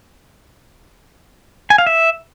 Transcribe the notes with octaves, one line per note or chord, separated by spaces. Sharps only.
G#5
F5
E5